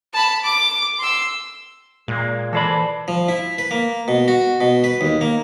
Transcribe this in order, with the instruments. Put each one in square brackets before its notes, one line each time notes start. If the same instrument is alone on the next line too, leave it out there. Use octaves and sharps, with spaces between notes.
[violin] A5 B5
D6
C6 E6
[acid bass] A#2 [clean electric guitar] G#3 A#3
[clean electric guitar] E3 C5 B5 [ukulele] A4 B4 D5
[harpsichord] F3
E4
B4
A#3
B2
F#4
B2
B4
D#2
A#3